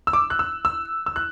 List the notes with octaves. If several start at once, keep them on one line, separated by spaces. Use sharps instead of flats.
E6
D6
F#6
E6
E6
E6
F#6